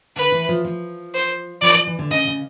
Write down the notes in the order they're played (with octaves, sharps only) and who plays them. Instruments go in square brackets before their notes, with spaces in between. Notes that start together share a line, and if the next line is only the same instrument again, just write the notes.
[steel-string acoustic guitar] D3 [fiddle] B4
[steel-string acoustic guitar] E3
F3
F3
[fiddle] C5
[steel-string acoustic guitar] F3 [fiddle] D5
[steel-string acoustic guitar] F3
E3
D3
[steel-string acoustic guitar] C#3 [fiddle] D#5
[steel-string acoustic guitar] C#3